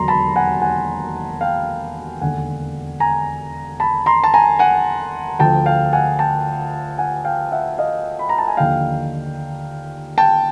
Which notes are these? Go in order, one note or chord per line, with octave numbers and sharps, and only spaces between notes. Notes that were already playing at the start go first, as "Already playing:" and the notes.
Already playing: E1 D#2 D3 F#3 A#5 C6
A5 B5
F#5 G#5
F#5 G#5
F5 G5
E1 D#2 D3 F#5 G#5
G#5 A#5
A5 B5
A#5 C6
A5
G#5 A#5
F#5 G#5
D2 D3 F3 G5 A5
F5 G5
F#5 G#5
G5 A5
F#5 G#5
F5 G5
E5 F#5
D#5 F5
B5
A#5
A5
G#5
D#2 D3 F3 F5 G5
G5 A5